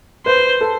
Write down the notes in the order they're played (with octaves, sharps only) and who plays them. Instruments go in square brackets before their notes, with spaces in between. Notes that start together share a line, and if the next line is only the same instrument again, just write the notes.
[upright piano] B4 [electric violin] C5
[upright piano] A4